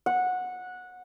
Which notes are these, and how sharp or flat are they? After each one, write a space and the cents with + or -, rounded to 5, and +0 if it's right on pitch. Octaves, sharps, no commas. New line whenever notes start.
F#5 -15